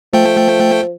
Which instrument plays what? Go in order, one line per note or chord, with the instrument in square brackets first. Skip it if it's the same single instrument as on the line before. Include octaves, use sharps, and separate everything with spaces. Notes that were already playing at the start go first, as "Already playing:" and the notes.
[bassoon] F3 [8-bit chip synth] A3 G5